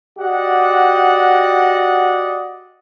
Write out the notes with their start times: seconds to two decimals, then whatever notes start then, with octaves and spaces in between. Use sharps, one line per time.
0.19 F#4 G4 D5 D#5 F#5